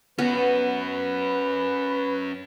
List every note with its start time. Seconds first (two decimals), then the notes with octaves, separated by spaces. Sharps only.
0.19 B3 C#4 F#4 B4